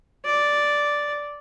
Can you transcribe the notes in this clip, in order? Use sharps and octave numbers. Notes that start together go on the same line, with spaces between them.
D5